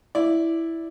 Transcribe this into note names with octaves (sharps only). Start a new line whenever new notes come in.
E4 D5